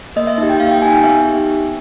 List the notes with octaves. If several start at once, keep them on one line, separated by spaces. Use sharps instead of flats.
A#3 D#5
E5
D#4 G4
G5
A#3 F5
G5
D#4 G4 G#5
G5
B3 E5
D#4 G4
B3